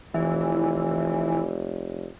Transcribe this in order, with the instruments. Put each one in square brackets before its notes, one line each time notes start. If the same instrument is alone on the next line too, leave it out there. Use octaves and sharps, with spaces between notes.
[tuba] F1 [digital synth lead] E3